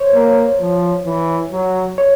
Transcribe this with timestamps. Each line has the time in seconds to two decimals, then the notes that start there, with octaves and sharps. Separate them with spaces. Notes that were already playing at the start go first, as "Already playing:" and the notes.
Already playing: C5 C#5
0.14 A#3
0.60 F3
1.05 E3
1.51 F#3
1.98 C#5